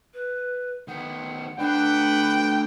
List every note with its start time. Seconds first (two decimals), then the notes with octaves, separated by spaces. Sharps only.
0.14 B4
0.88 D#3 B3 F#5
1.59 A3 D4 B4 D5 F#5 G5